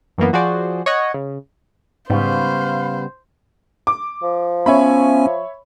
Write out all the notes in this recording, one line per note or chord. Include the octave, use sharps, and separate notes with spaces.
F#2 E3 A#3 B3
F3 F#4 G#4 C5 D5
C#5 D#5 F#5
C#3
G#2 C#3 G3 B3 C5 F5 B5
D6
F3
B3 C#4 C#5 E5 G#5 B5